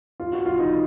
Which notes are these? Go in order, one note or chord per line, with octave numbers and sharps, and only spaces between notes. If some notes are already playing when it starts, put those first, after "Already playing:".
F4
F#4
F4
D#4